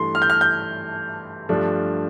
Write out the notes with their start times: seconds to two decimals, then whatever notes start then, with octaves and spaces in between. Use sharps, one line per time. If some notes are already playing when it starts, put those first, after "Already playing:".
Already playing: G2 E3 A3 C6
0.15 F6
0.22 G6
0.30 F6
0.41 G6
1.49 G2 F3 A3 D4